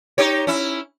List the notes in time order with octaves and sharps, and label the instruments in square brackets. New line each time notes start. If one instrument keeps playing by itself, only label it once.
[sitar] D#4 G4 C#5
C#4 E4